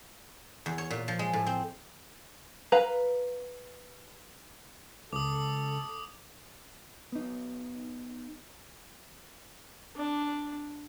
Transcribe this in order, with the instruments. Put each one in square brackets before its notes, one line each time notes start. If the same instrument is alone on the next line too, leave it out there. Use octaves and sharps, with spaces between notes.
[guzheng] E2
C#5
A#2
F3
G#3
A2
C4
[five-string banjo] B4 F5 A#5
[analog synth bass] C#2 [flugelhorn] A4 [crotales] D6 D#6
[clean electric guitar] B3 D#4
[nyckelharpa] D4